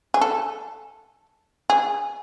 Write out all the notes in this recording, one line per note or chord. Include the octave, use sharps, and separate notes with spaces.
G#4
A4
G#4